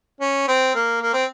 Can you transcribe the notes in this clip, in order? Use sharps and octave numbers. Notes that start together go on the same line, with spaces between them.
C#4
C4
A#3
A#3
C4